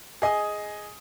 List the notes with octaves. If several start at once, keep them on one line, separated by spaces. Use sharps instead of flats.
G#4 D#5 G#5 D#6